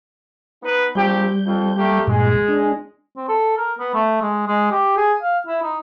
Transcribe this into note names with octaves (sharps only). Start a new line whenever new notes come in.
B3 D#4 B4
A#1 G3 C4 G4 G6
F2
A3 A#3 G4
G2 A#2 G#3
D4
C4
A4
A#4
B3
A3
G#3
G#3
G4
G#4
F5
E4
D#4